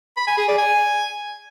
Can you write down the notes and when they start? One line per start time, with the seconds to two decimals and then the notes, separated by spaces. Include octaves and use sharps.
0.17 B5
0.27 G#5
0.38 G#4
0.48 D5
0.58 G#5